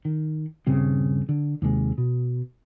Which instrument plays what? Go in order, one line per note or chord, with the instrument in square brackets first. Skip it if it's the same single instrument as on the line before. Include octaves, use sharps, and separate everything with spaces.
[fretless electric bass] D#3
D#1 G2 C#3 C4
D3
D#2 C3 G#3
B2